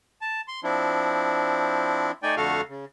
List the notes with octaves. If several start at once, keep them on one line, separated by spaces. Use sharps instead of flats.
A5
C6
F3 C4 D4 E4
A3 D#4 D5 G5 G#5
F2 D3 A3 F#4 A4 F5
C#3